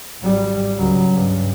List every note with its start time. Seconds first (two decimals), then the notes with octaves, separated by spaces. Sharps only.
0.21 G#1 G3
0.76 C#2 F#3
1.13 G2 C#3